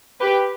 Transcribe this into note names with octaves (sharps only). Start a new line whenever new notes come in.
G4 B4